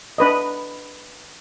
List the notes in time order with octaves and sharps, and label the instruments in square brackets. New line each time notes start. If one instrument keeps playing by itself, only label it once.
[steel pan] D4 B4 D#5